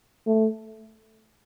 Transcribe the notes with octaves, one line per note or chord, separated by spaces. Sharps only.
A3